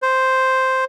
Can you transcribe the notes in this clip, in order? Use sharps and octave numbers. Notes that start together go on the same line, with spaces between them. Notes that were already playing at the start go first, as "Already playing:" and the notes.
C5